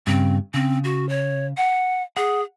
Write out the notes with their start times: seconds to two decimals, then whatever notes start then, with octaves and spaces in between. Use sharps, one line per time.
0.07 G2 C#3 C4
0.54 C#3 C4
0.84 F#4
1.09 C#5
1.57 F#5
2.17 G#4 F#5